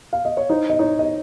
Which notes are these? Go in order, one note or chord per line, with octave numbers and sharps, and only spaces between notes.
F5
D#5
C#5
D#4 C5
D#5
D#4 C#5
D#5